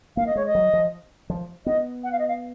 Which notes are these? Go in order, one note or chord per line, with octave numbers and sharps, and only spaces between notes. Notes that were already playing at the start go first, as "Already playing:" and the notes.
A#3 F5
D#5
G#3 C#5
D#5
F#3
F3
F3
B3 D#5
F#5
F5
D#5
F5